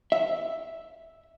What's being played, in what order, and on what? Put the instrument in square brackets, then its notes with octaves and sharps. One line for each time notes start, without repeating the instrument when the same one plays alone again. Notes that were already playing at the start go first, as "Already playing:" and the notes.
[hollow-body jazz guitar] E5